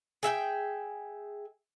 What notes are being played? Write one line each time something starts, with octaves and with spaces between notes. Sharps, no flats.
G#4 E5 F#5 G5